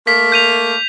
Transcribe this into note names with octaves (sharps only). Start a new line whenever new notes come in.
A3 A#3 B6
G6 D#7 F7